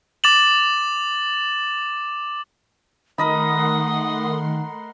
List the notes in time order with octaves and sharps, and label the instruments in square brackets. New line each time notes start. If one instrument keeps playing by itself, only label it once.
[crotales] D6 A6 E7 F#7
[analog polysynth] D#3 [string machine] A3 F#5 C6 [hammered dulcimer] A#4 D#5 B5 [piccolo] D#6